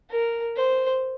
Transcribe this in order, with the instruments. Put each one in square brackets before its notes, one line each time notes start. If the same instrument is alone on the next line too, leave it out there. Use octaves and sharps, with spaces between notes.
[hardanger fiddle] A#4
C5